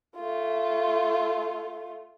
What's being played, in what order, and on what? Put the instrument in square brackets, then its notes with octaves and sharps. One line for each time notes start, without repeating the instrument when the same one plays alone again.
[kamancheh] A3 F4